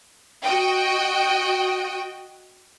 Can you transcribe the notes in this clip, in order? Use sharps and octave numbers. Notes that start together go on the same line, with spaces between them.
F#4 D#5 G5